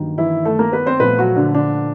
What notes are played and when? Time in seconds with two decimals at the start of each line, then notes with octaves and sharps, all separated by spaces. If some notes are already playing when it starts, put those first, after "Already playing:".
Already playing: G2 D#3 F#3 A#3
0.18 E3 E4
0.45 A3 A4
0.59 A#3 A#4
0.72 B3 B4
0.86 C4 C5
1.00 A#2 F3 A3 B3 B4
1.18 F#3 F#4
1.36 D3 D4
1.55 D3 D4